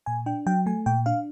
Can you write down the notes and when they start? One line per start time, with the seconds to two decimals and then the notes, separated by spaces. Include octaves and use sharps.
0.06 A#2 G#5
0.26 D4 G5
0.46 F#3 G5
0.66 A3 G#5
0.86 A#2 G5
1.06 D4 F5